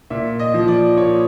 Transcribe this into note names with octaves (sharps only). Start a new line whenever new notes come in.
A#2 E5
D#5
F3
D5
A#2 C#5